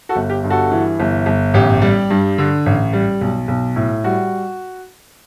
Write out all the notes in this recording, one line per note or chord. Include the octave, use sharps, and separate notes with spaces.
F#4 A4
G1
G4
G2
F#4 A4
E3
G1
G1
A1 G4
G3
G2
D3
A1
G3
B1
B1
A2
G3 F#4